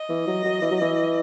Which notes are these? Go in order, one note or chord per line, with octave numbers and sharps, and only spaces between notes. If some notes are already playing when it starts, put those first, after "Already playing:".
Already playing: D#5
E3
F#3
F#3
E3
F#3
E3